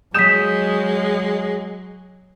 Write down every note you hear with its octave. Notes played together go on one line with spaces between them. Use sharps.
F#3 G#3 D#6 G6 B6 E7